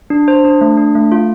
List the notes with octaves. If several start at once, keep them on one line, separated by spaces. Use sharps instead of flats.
D4
C5
D4
A3
D4
A3
F4